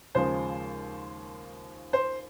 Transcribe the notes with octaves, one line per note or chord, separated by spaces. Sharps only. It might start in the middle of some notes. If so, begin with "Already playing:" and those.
D#2 C#3 F3 G#3 C5
C5